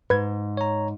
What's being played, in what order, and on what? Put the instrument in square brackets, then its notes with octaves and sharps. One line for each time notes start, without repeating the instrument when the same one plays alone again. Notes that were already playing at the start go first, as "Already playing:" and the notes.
[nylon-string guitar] G#2 [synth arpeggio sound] B4 G#6
[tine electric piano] C#5 A#5